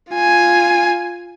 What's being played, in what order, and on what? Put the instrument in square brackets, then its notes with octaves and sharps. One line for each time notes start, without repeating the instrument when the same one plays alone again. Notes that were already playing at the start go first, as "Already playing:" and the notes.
[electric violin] F4 G#5